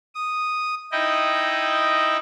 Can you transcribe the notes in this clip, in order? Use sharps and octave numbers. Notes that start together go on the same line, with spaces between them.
D#6
D#4 E4 D#5 G5